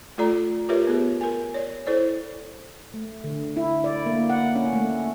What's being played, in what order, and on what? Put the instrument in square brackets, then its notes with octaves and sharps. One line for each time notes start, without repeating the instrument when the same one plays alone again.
[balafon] A3 F4 A4 D5 A#5
F4 G4 A#4 B4 C#5 E5
B3 G#4
A#4 G#5
C#5 D5
E4 A4 C5 D5
[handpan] A3
D3
E4
D5
A#3
F#5
C#4
A3